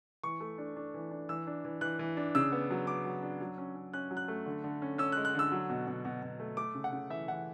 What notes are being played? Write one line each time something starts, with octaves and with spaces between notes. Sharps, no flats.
E3 C#6
A3
D4
D4
E3
D4
E3 E6
D4
E3
E3 F#6
E3
D4
C#3 E6
B3
F#3
B3 D6
F#3
D4
F#3
C#4
C#4
C#4 F#6
F#3
F#6
A3
D3
D3
C#4
C#4 E6
F#6
G#3
F#6
D3 E6
F#3
B2
B2
B2
B2
A3
A3 D6
C#3
F#5
C#3
E3 E5
E3 F#5